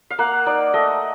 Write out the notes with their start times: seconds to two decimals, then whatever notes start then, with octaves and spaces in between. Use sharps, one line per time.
0.10 F5
0.19 A#3 F#5
0.46 D#4 D5
0.74 A3 D#5